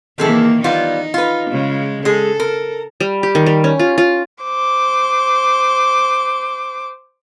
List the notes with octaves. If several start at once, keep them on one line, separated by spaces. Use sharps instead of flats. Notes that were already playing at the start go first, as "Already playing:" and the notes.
C3 D#3 E3 A#3 G#4 A4
G3 B3 D#4 F4
F4 B4
C#3 G#3
G#3 G#4 A4
A#4
G3
G4
D#3
G3
C#4
F4
F4
C5 D6